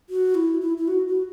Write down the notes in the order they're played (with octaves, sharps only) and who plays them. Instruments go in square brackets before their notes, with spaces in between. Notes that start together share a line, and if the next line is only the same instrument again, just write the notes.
[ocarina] F#4
E4
E4
E4
F#4
F#4